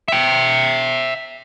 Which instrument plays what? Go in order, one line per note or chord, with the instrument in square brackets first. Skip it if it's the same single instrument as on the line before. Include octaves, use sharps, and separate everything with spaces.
[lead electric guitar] E5 G5